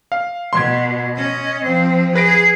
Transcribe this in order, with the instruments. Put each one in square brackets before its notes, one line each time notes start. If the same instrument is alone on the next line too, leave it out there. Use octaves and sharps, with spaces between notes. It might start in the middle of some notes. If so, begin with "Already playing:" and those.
[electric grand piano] F5
[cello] B2 [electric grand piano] C6 G#6
[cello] C#4 D#5
F3 C4
[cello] G#4 [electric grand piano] B4 A#6 D7